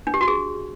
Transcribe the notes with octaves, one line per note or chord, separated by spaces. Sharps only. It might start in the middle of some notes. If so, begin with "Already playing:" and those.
D4
G4
F#4
G#4